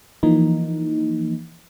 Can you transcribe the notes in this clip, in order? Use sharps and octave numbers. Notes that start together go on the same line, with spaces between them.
E3 F3 A#3 D#4